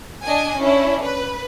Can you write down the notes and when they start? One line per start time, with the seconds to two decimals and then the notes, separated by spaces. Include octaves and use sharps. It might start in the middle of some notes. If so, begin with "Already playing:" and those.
0.24 D4 D#5 G#5
0.58 C#4 D4 E4
1.03 B4